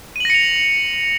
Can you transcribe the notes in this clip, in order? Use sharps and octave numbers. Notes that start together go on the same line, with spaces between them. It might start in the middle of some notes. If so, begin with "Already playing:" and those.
A#6 C#7 D#7 F7 F#7